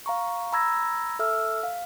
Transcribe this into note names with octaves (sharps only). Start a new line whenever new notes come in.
F5 A#5 C#6
A#5 B5 E6 G#6 A#6
A4 E5 E6 F6
F5